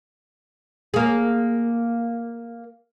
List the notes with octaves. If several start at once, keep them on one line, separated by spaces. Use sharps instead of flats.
A#3 G#4